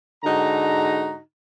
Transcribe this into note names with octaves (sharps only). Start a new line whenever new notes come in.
G#2 D3 D#4 F#4 A#5